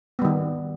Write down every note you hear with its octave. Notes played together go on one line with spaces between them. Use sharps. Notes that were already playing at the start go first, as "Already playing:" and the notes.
D#3 G3 B3